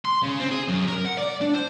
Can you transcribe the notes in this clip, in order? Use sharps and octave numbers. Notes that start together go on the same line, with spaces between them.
C6
C#3
C4
G#4
F#2
A#4
F#5
D5
D4
C5